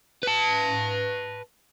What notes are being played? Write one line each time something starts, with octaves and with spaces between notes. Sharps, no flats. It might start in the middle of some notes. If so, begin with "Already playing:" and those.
B4 A5